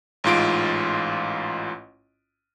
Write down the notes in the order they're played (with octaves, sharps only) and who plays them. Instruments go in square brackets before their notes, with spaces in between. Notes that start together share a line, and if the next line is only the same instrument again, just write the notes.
[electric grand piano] A1 G#2 F4 D7